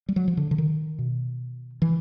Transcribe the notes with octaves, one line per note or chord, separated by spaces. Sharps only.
G3
F#3
F3
D3
D3
D#3
B2
E3